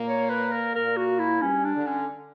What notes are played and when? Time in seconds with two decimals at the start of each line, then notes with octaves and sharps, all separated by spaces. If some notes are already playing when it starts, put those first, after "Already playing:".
Already playing: A#2 A#3
0.08 C#5
0.30 B4
0.52 A#4
0.75 A#2 A#3 A#4
0.97 F#4
1.19 E4
1.41 G2 G3 C#4
1.65 D4
1.75 D3
1.86 C#4